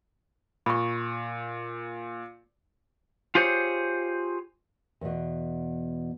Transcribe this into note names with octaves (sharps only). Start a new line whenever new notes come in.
A#2 B5 C#6
F4 G4 G#4 C5 C#5
E2 B2